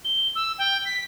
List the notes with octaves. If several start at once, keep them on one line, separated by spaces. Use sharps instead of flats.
G7
E6
G5
B6